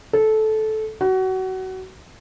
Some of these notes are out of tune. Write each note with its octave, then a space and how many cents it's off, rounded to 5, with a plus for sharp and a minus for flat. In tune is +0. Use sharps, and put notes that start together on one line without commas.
A4 -15
F#4 +25